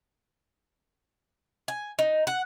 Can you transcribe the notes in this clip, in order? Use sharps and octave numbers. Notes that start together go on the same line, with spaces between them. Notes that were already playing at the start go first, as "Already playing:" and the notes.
G#5
D#4
F#5